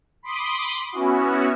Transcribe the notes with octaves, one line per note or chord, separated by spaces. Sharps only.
B5 C6 D6 D#6
B3 C#4 E4 F#4